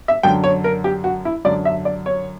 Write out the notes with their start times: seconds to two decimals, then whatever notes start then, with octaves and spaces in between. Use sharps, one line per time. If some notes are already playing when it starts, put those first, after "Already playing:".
0.08 E5
0.23 F#2 D3 F#3 G5
0.44 C#5
0.64 A#4
0.84 G4
1.04 F#4
1.25 E4
1.45 F#2 D3 F#3 D5
1.65 E5
1.85 D5
2.06 C#5